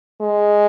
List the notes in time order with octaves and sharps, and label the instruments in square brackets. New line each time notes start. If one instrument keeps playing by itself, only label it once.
[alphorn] G#3